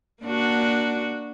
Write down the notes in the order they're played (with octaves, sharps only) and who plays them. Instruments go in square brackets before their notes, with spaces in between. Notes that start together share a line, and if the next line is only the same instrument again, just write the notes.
[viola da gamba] A#3 D4 F#4